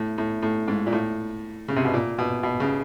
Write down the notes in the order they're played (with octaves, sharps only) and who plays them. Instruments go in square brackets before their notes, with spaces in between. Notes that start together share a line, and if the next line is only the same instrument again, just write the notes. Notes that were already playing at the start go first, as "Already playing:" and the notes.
Already playing: [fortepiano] A2
A2
A2
G#2
A#2
A2
C#3
C3
B2
A#2
B2
B2
C#3